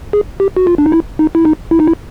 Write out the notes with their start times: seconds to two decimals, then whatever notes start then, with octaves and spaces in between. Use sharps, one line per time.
0.13 G#4
0.40 G4
0.57 F#4
0.67 F4
0.78 D4
0.86 D#4
0.92 E4
1.19 D#4
1.35 E4
1.45 D#4
1.71 E4
1.80 D#4
1.87 E4